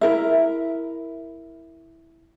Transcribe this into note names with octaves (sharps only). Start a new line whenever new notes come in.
E4 A#4 E5